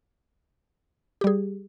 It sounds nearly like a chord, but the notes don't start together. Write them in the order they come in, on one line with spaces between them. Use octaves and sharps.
G4 G3 G#4